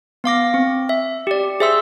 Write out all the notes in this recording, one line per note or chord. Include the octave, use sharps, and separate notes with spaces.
B3 F5 D6 A#6
C4
E5
G4 D5
G#4 C5 E5 C6 E6